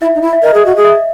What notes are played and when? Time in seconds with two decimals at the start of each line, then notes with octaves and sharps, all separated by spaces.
0.01 E4 E5
0.15 D#4
0.22 E4
0.33 E5
0.43 A#4 D#5
0.54 G#4
0.66 F#4
0.76 G#4
0.84 E5